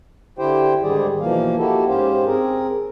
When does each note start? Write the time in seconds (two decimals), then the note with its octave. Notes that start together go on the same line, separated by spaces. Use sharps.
0.39 D3 E4 G4 C5 G5
0.83 G#2 D3 D#3 G3 G#4 D5
1.21 B2 E3 F3 A#3 F5
1.58 A#3 E4 F#4 G4 A4
1.88 G#2 C#4 G4 C5 F5
2.25 C4 G#4 A#4